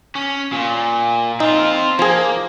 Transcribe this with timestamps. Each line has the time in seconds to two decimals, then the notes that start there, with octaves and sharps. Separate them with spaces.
0.16 C#4
0.52 A#2
1.40 C4 D#4 F4
1.99 F3 A#3 G#4